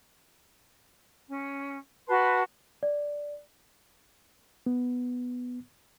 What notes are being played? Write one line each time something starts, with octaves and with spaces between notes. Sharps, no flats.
C#4
F#4 B4 A5 C6
D5
B3